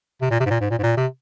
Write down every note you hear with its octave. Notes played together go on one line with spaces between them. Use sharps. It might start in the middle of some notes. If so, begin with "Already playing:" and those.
C3
A#2
C3
G#2
A#2
G#2
A#2
G#2
A#2
C3